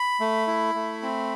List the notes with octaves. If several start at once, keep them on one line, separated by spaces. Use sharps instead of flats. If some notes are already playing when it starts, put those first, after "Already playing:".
Already playing: B5
A3
E4
A3
C4